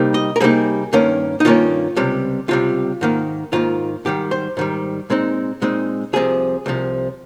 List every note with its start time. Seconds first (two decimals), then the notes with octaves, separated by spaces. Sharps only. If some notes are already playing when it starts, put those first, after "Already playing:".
Already playing: C3 G3 A#3 D#4
0.14 D#5
0.36 A#4
0.40 C3 G3 A#3 D#4 G#4
0.93 G2 D#3 A#3 C#4
1.40 D#4
1.45 G2 D#3 A#3 C#4 F4
1.96 C#2 C3 G3
2.48 C#2 C3 G3 F4
3.01 G#2 D#3 A#3
3.53 G#2 D#3 A#3 F4
4.05 G#2 D#3 G3 G4
4.31 C5
4.57 G#2 D#3 G3
5.10 A#2 G#3 C4 D#4
5.62 A#2 G#3 C4 D#4
6.13 C2 C3 F3 G#4
6.66 C2 C3 F3